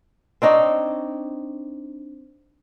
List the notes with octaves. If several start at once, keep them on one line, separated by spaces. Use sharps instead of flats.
C4 D4 D#4 C#5